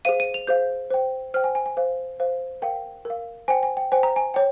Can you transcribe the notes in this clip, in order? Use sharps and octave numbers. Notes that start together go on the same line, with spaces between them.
G#4 C5 F5 D#7
D#7
F7
G#4 C5 F5 G6
C5 G5
C5 G5 F6
G#5
G#5
G#5
C5 F5
C5 F5
A#4 F5 G5
A#4 F5
C5 G5 G#5
G#5
G5
C5 G5 G#5
A#5
G#5
C#5 G5